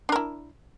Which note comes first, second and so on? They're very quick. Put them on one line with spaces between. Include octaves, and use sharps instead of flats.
D4 A#4 E4